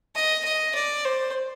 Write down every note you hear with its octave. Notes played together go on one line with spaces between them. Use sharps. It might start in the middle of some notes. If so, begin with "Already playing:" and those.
D#5
D#5
D5
C5